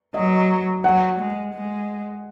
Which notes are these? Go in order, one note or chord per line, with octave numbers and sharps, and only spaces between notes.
F#3 D#5
F#3 F#5
G#3
G#3